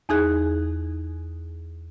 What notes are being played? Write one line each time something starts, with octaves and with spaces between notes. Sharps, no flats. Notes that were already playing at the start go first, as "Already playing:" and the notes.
E2 D#4 G#4 F#6